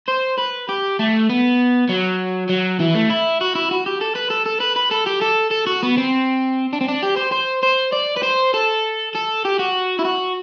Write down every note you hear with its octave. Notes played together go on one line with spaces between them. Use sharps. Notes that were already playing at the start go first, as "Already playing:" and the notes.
C5
B4
G4
A3
B3
F#3
F#3
E3
A3
E4
F#4
E4
F#4
G4
A4
B4
A4
A4
B4
B4
A4
G4
A4
A4
F#4
B3
C4
D4
C4
D4
G4
C5
C5
C5
D5
B4
C5
A4
A4
G4
F#4
E4
F#4